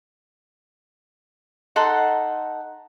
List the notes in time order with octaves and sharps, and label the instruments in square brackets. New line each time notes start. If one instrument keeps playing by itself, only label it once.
[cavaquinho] D#4 A4 F#5 C6